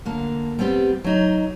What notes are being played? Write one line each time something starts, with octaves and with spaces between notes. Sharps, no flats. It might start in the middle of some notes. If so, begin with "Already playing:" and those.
D3 A#3
G3 B3 C4 G4
F#3 D#4